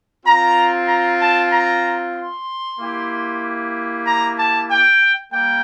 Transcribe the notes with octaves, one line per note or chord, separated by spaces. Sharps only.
C4 F4 A#5
A#5
A5
A#5
C6
A#3 E4 G4
A#5
A5
G5
G3 A#3 G5